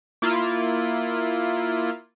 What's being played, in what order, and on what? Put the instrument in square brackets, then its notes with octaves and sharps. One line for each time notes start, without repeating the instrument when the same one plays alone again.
[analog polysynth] A#3 E4 F4